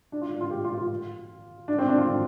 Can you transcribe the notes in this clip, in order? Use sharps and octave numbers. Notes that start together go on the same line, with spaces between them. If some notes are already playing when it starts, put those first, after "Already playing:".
D4
F4
D4
F4
G4
F4
F4
D4
C4
D4
F4
D4